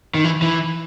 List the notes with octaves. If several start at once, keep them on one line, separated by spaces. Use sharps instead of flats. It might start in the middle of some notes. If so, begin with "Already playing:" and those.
D#3
E3
E3